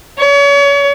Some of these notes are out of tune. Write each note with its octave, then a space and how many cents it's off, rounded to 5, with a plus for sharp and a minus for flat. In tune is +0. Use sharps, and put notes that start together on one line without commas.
C#5 +35